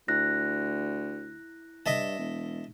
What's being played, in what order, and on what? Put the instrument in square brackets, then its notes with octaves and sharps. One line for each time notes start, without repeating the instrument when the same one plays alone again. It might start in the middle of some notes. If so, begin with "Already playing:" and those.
[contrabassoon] D2 [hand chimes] E4 F#6 A#6
[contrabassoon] G2 [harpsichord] D#5 E5 A5
[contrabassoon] E1